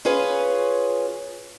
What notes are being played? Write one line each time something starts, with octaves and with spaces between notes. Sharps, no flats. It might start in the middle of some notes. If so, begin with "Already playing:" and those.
C#4 F4 G#4 B4 C#5